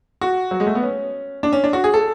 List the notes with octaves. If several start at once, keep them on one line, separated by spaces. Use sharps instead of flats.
F#4
F#3
G#3
A3
B3
C#4
D4
C#4
D4
F#4
G#4
A4